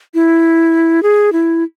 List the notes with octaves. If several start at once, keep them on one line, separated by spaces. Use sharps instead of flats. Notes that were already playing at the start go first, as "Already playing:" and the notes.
E4
G#4
E4